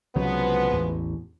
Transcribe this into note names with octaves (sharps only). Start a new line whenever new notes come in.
C2 C#3 F3 F#3 G#3 B3
A1 E2